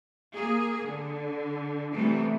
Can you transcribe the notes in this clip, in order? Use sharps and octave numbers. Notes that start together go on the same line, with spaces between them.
A#3 G#4
D3
C3 E3 G3 A3 B3